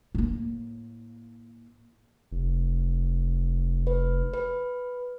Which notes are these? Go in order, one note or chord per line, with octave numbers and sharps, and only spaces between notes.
A2 A#3
F1
B4
B4